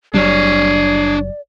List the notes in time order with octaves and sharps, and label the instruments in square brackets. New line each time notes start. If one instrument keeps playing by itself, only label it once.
[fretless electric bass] F#1 F#3 G3 [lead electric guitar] D4 C#5 [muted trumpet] G#4 [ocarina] D5